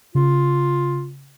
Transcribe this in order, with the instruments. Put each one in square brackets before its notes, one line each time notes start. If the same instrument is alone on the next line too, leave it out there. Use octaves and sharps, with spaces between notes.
[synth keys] C#3 [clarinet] F4